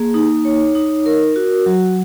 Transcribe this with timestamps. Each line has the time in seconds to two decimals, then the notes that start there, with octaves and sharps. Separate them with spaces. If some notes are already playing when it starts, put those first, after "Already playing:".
Already playing: A#3 G#4
0.14 D#4
0.45 C#5
0.75 D#4
1.06 A#4
1.36 F#4
1.66 F#3